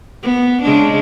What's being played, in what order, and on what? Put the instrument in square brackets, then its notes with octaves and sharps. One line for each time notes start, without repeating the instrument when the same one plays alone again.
[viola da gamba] B3
C#3 G#3 D4